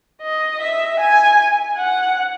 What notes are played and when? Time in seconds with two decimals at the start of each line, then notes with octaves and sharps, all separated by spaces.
0.22 D#5
0.61 E5
1.00 G#5
1.77 F#5